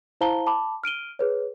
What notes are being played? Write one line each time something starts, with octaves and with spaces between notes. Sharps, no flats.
E4 C5 F5 A5 A#5 G7
A5 B5 D6
F6 D7 D#7 G7
G#4 B4 C#5